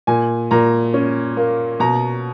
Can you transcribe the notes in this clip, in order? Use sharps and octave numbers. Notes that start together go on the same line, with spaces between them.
A#2 G#5
A#2 A#5
C#4
A#3
B2 A#5